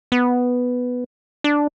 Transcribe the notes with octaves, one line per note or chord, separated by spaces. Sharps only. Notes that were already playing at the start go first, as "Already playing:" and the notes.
B3
D4